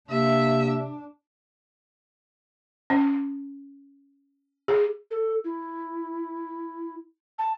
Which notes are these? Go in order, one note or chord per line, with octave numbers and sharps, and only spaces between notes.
C3 A#3 D4 E5
C#4
G#4
A4
E4
A5